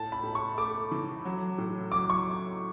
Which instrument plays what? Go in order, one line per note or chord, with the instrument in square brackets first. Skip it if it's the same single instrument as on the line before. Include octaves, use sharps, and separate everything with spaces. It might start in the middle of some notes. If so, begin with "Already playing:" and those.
Already playing: [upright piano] A2 [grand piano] A5
[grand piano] B5
[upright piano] A2
[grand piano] C#6
[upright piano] A3 [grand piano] D6
[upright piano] E3
F#3
A2
[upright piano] F#3 [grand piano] D6
[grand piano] C#6